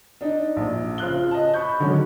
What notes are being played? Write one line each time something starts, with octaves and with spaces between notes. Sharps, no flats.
D4 D#4
A#1
C#3 F4 C5 F#6 G7
D#5 A5
B5 C#6 G6
D3 D#3 F#3 G#3 C#4